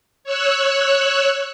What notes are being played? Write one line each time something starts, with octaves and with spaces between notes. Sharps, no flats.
C#5 E6 F#6